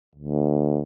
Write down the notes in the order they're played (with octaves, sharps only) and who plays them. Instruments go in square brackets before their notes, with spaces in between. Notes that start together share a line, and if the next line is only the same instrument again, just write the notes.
[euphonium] D2